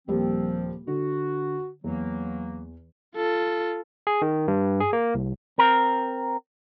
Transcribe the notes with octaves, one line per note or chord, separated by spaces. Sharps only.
D#1 F3 G3 A#3 C4
D3 F#4
E2 E3 F#3 A#3
F4 A4
G#4
D#3
G2
G#4
A#3
C2
C4 A#4